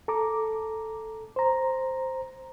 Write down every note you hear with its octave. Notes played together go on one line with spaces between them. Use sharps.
A4 A#5 D6
C5 A#5